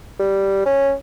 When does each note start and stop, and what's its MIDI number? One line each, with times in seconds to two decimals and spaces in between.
0.20 0.61 55
0.66 0.92 61